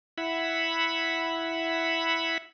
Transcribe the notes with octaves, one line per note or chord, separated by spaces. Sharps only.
E4 E5 F#5 B5